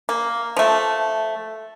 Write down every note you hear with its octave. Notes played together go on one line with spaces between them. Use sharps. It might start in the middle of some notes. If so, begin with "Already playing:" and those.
A#3
F3 A3